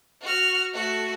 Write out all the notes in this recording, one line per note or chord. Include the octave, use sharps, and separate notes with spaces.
F#4 F6
A3 F#4